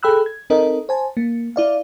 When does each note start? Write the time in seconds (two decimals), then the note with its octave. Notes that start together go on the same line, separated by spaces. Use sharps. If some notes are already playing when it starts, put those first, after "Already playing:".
0.03 G#4 A4 G5 B5 E6 F#6
0.26 G#6
0.50 C4 D#4 A4 A#4 D#5
0.89 C5 G#5 A5
1.17 A#3
1.56 E4 D5 F5